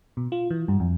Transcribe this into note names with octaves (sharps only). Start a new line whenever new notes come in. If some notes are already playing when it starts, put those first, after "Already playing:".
B2
F4
E3
G2
F2